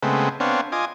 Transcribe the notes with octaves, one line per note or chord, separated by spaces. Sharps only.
C#3 G#3 A3 B3 C4
B3 C4 D4 C#5 F5
F4 D#5 G#5 D6